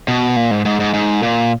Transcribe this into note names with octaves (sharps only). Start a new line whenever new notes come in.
B2
A#2
G#2
G#2
G#2
G#2
A#2